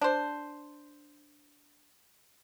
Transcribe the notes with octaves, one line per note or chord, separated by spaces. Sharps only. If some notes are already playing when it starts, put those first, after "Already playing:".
D4 C5